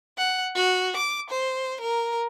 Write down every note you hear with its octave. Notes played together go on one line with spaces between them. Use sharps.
F#5
F#4
D6
C5
A#4